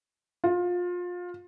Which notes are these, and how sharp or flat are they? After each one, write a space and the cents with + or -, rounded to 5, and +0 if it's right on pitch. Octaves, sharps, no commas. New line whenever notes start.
F4 +25